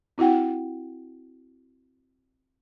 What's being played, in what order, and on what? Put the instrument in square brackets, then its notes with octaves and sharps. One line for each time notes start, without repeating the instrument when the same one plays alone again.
[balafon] C4 E4 F#4 F#5 G5